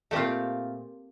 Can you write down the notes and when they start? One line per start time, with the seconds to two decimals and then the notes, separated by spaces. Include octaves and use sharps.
0.11 A#2 A3 C4 F4 G4